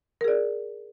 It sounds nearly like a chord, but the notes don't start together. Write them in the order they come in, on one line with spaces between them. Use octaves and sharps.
A#4 G#4 D5